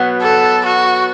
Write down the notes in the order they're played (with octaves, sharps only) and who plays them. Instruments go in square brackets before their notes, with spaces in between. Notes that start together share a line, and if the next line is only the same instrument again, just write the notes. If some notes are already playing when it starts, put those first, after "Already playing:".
Already playing: [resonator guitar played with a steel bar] B2 F#3 B3
[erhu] A4
F#4